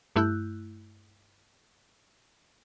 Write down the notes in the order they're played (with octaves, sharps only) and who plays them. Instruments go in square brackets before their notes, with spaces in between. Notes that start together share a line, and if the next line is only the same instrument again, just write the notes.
[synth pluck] G2 A3 E4 E6 F#6 G6